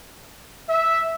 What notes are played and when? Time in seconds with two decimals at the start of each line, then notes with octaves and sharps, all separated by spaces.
0.69 E5